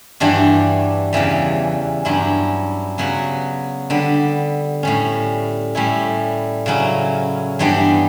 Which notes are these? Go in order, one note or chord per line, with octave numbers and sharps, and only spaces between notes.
G2 E3 G3 D4 F#4
E2 C#3 E3 G3
G2 F#3 C#4 E4
C#3 F#3 B3 F#4
D3 G3 B3
A2 G3 C#4
A2 G3 C#4 E4
C#3 F#3 C#4 E4
G2 E3 G3 B3 D4